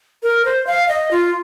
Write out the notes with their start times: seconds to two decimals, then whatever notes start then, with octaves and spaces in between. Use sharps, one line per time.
0.23 A#4
0.45 C5
0.67 F5
0.88 D#5
1.11 F4